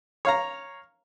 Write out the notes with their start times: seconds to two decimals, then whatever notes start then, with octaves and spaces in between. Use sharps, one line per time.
0.25 C#5 F5 A#5